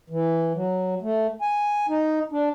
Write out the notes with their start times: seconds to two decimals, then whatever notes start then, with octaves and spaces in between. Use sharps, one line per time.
0.10 E3
0.55 F#3
1.02 A3
1.41 G#5
1.89 D#4
2.32 D4